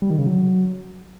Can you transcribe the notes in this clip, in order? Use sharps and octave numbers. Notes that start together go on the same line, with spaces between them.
G3
D#3
C#3
F#3